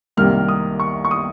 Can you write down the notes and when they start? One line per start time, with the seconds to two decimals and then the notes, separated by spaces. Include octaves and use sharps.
0.17 C2 C3 D#3 A#3 F6
0.49 D#6
0.80 C#6
1.05 C#6
1.11 D#6